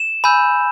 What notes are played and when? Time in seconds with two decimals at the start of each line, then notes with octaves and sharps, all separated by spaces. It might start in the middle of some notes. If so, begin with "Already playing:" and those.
Already playing: E7
0.24 G#5 B5 E6 G6